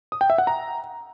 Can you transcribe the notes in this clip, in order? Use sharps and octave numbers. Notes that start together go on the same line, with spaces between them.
D#6
G5
E5
F#5
A#5